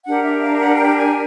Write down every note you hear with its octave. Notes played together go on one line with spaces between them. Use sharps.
D4 G4 A#4 F#5
E5
F5
F#5
G5
G#5